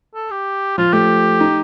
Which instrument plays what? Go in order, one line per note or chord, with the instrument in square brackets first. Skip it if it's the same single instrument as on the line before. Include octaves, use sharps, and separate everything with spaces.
[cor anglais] A4
G4
[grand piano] F3 [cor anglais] F4
[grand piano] A3 [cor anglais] G4
[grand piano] D#4